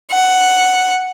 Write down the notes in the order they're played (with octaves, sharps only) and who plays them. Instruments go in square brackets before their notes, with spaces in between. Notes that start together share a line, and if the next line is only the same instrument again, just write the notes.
[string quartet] F#5